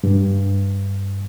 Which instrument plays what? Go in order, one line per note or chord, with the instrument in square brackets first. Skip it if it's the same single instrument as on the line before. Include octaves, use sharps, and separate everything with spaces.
[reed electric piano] G2